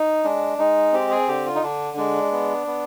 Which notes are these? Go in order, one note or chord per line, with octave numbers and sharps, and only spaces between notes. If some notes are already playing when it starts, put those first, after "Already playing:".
Already playing: D#4
G#3 D4
G#3 D#4
C4 G4
G#4
D3 G4
F4
D#4
D3 D4
G#3 D4
B3
B3